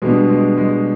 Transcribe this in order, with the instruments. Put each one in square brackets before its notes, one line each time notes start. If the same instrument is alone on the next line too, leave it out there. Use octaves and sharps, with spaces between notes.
[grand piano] B2 G3 B3 D4 [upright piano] G#3
[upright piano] G#3
G#3